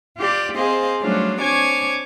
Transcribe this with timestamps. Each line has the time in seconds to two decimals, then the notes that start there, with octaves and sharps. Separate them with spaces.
0.17 F4 G4 D5
0.55 C4 G#4 C5 D#5 F5
1.01 F#3 G3 A3 C#4 D4 F4
1.40 C4 D4 C#5 G#5 D6 G#6